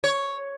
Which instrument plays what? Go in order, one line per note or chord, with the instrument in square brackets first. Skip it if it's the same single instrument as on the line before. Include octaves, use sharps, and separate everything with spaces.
[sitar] C#5